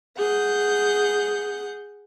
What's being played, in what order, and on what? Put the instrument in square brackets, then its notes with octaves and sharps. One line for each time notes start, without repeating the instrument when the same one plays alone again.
[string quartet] G#4 F#5 G6